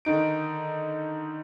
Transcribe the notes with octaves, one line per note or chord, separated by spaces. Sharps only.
D3 D#3 D#4 D7